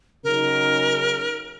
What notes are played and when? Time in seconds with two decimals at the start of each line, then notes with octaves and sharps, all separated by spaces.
0.24 C#3 F#3 D#4 A#4